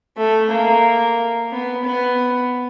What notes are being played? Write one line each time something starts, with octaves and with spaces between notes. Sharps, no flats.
A3
A#3
B3
B3